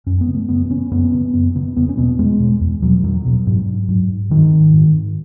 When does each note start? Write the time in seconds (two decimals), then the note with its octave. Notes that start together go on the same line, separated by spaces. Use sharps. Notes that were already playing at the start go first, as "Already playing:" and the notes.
0.06 F#2 C#4
0.21 B3
0.28 C#3
0.35 A3
0.49 F#2 B3
0.66 B3
0.70 C#3 C#4
0.91 F#2 B3
1.13 C#3
1.34 F#2 B3
1.55 C#3 B3
1.76 E2 B3
1.89 C#4
1.97 B2 B3
2.18 E2 G#3
2.40 B2
2.61 E2
2.82 B2 F#3
3.03 E2 F#3
3.25 B2
3.47 G#2
3.88 G#2
4.30 G#2 D#3
4.73 G#2